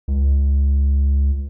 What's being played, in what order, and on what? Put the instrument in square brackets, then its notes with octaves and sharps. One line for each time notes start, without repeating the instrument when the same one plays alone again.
[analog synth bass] C#2